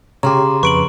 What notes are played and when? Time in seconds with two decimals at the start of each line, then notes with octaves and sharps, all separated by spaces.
0.23 C#3 G4 C#5 A#5 C6 D6
0.63 F2 B4 C#6 D7 F#7